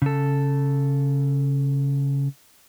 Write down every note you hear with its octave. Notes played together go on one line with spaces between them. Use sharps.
C#3 A4